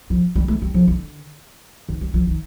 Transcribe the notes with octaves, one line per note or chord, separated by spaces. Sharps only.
F3
G3
A3
G3
F3
D3
D#3
G3
F3
D#3